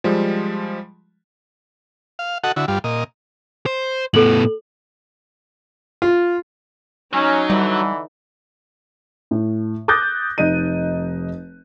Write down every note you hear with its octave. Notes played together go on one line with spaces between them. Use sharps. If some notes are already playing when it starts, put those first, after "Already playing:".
F3 G3 G#3
F5
F#4 A4 D#5 F#5
D3 E4 F#4
G2 G3 F4
A#2 D#5
C5
A2 B3 A4 F#7
F4
F#3 C#4 D#4
D3 E3 G3
A2
D6 D#6 F#6 G6 A6 A#6
F1 D#4 D#5 D#7